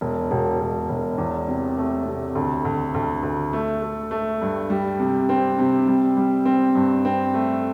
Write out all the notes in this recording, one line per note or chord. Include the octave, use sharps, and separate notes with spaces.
E1
E1
E1
E1
E2
C3
A3
C3
D2
D2
D2
D2
A3
A3
A3
G2
G3
C3
C4
C3
G3
G3
C4
G2
C4
A3